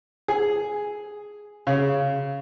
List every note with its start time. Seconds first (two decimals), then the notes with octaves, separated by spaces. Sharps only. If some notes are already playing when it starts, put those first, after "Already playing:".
0.28 G#4
1.67 C#3